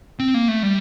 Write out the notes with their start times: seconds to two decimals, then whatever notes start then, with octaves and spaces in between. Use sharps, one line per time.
0.19 C4
0.34 A#3
0.48 A3
0.63 G3